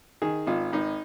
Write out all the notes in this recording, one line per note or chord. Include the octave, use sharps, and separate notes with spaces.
D#3 G#4
G#1 F4
G#1 D#4